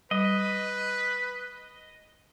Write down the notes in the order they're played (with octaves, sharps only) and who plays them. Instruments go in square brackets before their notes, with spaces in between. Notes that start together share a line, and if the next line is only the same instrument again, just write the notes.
[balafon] G3 [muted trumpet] B4 [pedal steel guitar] D#5